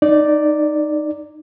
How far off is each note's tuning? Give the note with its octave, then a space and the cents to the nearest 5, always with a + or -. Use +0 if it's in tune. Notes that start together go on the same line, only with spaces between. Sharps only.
D#4 -15 D5 +0